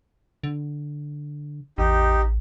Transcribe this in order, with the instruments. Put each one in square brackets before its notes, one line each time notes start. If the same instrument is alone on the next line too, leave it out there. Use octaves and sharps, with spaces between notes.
[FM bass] D3
[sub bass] A1 [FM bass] E2 [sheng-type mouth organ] D#4 G4